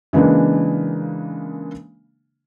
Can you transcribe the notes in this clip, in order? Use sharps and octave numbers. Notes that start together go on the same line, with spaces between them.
C#3 E3 G#3 A#3 D4